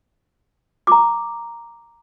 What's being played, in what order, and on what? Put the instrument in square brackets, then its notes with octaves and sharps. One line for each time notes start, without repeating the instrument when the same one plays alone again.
[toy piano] A#5 D6